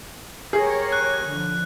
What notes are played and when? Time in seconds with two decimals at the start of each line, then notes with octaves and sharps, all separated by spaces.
0.53 G4 G#4 A#4 C#5
0.92 F#6
1.26 D3 F3